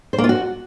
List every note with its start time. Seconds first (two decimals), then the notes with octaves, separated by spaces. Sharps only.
0.13 C5
0.18 A#3
0.24 F4
0.29 F#4